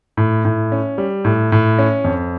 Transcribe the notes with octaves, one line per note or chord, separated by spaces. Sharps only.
A2
A2
C#4
G3
A2
A2
C#4
F2